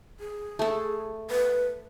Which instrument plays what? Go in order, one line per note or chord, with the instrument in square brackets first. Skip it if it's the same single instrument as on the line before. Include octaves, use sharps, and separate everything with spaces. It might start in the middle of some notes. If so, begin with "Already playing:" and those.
[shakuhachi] G#4
[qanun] A3 A4
[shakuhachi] B4